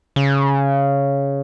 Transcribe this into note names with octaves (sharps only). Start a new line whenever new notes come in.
C#3